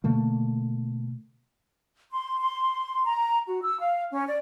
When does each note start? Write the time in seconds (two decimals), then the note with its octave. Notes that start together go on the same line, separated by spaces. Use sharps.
0.04 B2 D3 A3 A#3
2.11 C6
2.40 C6
3.05 A#5
3.47 F#4
3.61 E6
3.79 F5
4.11 C#4
4.27 D5